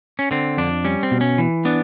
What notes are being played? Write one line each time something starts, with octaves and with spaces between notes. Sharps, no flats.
C#4
D3 C4
F2 D4
G3 C#4
C4
B2
C#4
E3
B3 D4